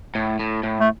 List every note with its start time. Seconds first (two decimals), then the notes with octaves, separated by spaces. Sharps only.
0.15 A2
0.39 A2
0.63 A2
0.80 A3